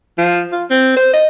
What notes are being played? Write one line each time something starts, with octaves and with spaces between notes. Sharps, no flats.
F3
F4
C4
C5
D#5